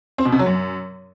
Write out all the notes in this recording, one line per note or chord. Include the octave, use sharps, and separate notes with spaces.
C4
B2
C3
F#3
F#2